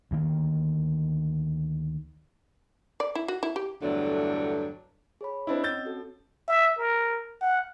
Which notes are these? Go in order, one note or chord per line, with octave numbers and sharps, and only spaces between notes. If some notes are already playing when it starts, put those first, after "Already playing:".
D2 D#3 A#3
D5
E4
F#4
E4
G4
E2 G2 D3 F#3 A3 D4
G#4 C#5 B5
C4 D4 E4 D#5
C4 C#4 E6 G6 A6
F#4 A4
E5
A#4
F#5